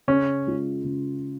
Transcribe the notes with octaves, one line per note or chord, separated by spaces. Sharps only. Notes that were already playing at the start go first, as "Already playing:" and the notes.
C#3 C#4
G#3 F4
C#3